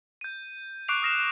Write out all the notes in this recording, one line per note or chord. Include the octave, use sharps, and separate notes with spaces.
G6 D#7
C#6 D6 F#6 C7 D7 F7
D#6 F6 A#6 C7 E7